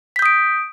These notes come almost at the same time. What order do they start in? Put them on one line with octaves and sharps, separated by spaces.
B6 G6 D#6 D7